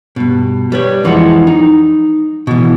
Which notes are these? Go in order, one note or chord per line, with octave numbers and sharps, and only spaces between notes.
G2 B2
G3 B4 C#5
F2 E3 F3 G#3 F#5
D#4
B2 E3